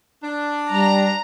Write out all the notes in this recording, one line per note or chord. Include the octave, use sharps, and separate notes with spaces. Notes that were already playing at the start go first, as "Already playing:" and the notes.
D4
G3 A#5